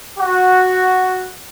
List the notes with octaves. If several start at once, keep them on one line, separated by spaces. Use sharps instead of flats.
F#4